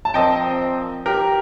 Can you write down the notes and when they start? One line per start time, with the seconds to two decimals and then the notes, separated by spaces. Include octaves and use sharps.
0.05 A5
0.14 A#2 F3 C4 D#5 G5
1.06 G4 A#4